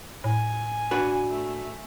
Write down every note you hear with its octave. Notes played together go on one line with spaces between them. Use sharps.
A2 G#5
D4 F#4 B4
A3